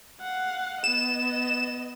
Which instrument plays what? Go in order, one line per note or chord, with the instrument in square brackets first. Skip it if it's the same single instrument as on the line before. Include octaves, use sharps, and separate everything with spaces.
[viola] F5 F#5
[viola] B3 D#5 [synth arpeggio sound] E7